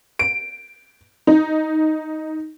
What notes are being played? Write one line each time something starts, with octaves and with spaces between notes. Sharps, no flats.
D7
D#4